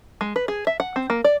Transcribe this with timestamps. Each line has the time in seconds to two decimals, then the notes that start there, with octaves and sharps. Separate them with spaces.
0.21 G#3
0.36 B4
0.48 G#4
0.67 E5
0.80 F#5
0.96 C4
1.10 A#3
1.24 D5